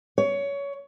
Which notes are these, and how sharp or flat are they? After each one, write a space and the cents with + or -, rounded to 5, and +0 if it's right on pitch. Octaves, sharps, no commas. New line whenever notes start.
C#5 +20